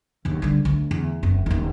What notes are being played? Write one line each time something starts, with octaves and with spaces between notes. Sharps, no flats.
D1 D#2
D3 G3
D2
E2
F#1 C4
D#1 D#3